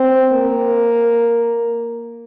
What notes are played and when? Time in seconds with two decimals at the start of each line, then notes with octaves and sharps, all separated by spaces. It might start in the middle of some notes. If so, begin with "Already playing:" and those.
Already playing: C4
0.33 A#3